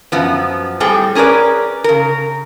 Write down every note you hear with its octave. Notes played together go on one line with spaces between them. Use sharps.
F#2 F3 B3
A2 G3 C4 G#4 A4 G5
C#4 G#4 A#4 B4 D5
C#3 A#4